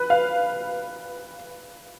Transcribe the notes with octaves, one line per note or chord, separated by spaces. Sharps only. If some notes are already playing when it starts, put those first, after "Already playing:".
Already playing: B4
F5